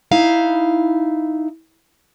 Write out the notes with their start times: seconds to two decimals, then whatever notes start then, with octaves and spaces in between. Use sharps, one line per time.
0.11 D#4 E4 F5